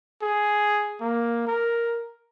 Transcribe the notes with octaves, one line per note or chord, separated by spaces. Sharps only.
G#4
A#3
A#4